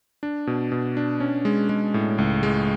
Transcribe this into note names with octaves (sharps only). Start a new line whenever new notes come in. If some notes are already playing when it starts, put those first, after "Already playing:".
D4
B2
B2
D4
C#4
G#3
G#3
A2
C#2
G#3